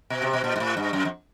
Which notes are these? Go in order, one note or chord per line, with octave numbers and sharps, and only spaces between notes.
B2
C3
B2
A#2
G#2
A2
G2
F#2
F2